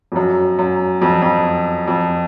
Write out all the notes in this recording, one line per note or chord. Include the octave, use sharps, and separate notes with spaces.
F2
F#2
F#2
F2
F2
F2